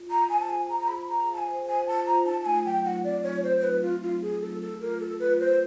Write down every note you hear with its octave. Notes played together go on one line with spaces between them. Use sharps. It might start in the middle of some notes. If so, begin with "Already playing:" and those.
Already playing: F4
F4 A#5
C5 G#5
A5
G#4 G#5
G#4 A#5
A#5
G#4 B5
G#4 A#5
F5
A5
G#5
C5
C5 G#5
F4 A5
F4 A#5
D#4 A5
A5
A3 G#5
F#3 G5
A3 F#5
C4 D5
F#3 C#5
C4 C5
C5
D#4 B4
C4 F4
F#3 F4
F#3 G#4
A3 A4
G#4 A4
F4 A#4
F4 A4
F4 B4
B4 C5